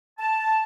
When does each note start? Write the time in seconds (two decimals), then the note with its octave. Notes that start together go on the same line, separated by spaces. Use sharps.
0.18 A5